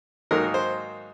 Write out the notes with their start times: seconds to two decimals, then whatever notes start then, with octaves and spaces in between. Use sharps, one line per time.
0.31 G#2 D#3 F#3 A#3 D#4 A#4
0.54 C5